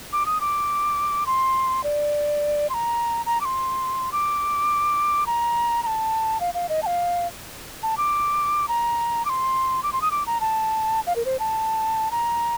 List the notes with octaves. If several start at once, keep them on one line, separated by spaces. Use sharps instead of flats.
D6
D#6
D6
C6
D5
C6
A#5
A#5
D6
C6
D6
A#5
A#5
A5
F5
F5
D#5
A5
F5
A5
D6
A#5
D6
C6
D6
C6
D#6
D6
A#5
A5
F5
A#4
C5
A5
A#5